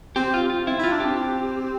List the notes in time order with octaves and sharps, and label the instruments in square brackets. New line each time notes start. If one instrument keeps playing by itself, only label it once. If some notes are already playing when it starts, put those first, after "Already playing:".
[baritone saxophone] C4 [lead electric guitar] G4
[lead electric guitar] F4
F4
[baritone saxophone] C4 [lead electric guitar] E4
[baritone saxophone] E4 [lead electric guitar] F4
[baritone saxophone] D4
[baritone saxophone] C4 [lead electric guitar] G4